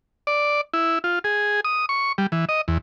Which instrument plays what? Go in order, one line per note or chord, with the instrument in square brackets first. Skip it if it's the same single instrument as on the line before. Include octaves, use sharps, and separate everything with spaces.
[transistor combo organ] D5
E4
F4
G#4
D#6
C#6
G3
E3
D#5
E2